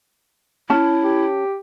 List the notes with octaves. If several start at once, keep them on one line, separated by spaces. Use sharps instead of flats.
C#4 E4 A5
G4